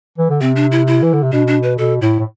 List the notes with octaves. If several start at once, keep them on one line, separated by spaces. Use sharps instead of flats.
E3
D3
C3 C4
D4
E4
E4
E3
D3
C3
B2 D4
D4
B4
B2 A4
A2 E4
A2